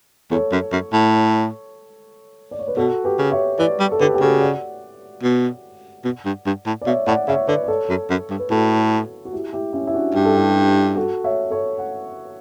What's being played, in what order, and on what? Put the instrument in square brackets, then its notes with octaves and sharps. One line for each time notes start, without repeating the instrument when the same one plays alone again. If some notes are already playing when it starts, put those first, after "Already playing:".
[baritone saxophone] E2 [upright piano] A4 C#5
[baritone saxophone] F#2
F#2
A2
[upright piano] D5
C#5
B4
[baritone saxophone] B2 [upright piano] F#4 A4
[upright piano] G4 B4
[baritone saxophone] C#3
[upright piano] C#5 E5
[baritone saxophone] E3 [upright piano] B4 D5
[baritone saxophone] G3
[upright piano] A4
[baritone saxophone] D3 [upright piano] G4 B4
[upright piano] G4
[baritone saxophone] C#3 [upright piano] F#4 A4
[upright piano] D5 F#5
[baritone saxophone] B2
B2
G2
G2
A2
[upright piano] D5
[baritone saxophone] B2 [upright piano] C#5 E5
[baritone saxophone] A2 [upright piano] D5 F#5
[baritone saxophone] C#3 [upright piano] C#5 E5
[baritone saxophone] D3 [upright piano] B4 D5
[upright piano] D5
A4 C#5
[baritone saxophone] F#2
F#2
G2
[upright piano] B4
[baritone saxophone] A2 [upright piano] F#4 A4
[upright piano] F#4
E4 G4
E4 G4
C#4 E4
E4
D4 F#4
[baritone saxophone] G2 [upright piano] G4
[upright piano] A4
E4 G4
F#4 A4
C#5 E5
A4 C#5
F#5